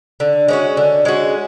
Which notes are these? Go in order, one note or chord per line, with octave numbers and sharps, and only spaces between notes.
D3
G#3 C#4 F#4
D3
G#3 C#4 F#4